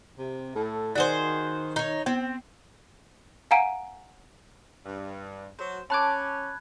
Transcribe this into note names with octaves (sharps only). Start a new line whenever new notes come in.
C3
A2 A4
D#3 F#4 G#4 C5 D5 F#5
D#4 C#5
B3 C4
F5 F#5 G#5 A#5 D7 D#7
G2
F#3 C5
C#4 A5 B5 D6 F#6 G#6